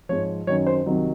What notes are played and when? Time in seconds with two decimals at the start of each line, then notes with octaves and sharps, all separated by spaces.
0.09 G#2 F3 C#5
0.47 F#2 D#3 F#3 C#5
0.67 C5
0.86 C2 C3 D#3 F#3